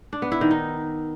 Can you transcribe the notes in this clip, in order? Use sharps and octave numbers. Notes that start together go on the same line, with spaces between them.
D4
B3
E4
D#3
D#4